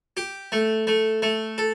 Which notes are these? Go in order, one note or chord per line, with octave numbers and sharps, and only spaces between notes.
G4
A3
A3
A3
A4